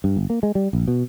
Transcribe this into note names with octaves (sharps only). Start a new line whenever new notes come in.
G2
G1
A#3
G#3
G3
A#1
B2